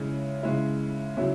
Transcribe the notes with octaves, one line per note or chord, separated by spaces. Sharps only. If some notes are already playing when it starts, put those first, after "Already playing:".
Already playing: C#3 G#3 E4
C#3 G#3 E4
C#3 F#3 E4